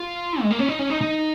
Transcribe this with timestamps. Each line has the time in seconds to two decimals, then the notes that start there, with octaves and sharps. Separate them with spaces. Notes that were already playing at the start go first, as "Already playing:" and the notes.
Already playing: F4
0.41 G#3
0.51 A#3
0.59 C#4
0.69 D#4
0.79 C#4
0.90 D#4
1.01 D#4